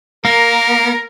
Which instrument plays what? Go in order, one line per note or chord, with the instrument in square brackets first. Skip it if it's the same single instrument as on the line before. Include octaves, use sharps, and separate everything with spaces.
[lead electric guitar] A#3 [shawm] A#4